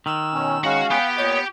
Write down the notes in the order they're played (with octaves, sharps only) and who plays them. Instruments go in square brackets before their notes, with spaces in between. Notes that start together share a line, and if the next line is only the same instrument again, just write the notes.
[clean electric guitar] D#3 [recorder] E6
[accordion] B2 C#4
[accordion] G#3 C#4 [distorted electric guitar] F#4 [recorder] F5
[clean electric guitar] B3 [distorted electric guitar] G4 G5
[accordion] A#2 D#5 G6 [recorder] C#5